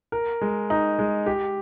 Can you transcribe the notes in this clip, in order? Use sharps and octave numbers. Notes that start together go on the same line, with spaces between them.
A#4
G#3
D#4
G#3
G4